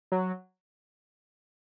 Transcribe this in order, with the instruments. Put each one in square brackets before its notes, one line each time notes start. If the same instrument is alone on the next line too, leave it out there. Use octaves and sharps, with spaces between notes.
[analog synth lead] F#3